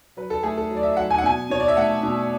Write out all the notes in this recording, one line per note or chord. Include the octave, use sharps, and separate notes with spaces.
F#3 B4
A4
A3 G#4
A4
F#3
D5
E5
F#3 F#5
G#5
F#5
B2 G#5
B2 C#5
D5
E5
A3 F#5
B2